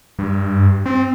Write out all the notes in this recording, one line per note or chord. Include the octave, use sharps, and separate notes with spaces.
G2
C4